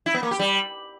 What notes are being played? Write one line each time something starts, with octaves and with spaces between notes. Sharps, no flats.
E4
B3
A#3
G4
G3